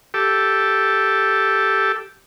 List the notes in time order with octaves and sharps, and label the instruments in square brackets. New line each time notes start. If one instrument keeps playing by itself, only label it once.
[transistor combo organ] G4 A4